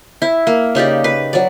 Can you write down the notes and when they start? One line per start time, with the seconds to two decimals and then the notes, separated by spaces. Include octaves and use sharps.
0.22 E4
0.47 A#3
0.75 C#3 D#4 G4 D5
1.04 B4
1.33 F#3 D5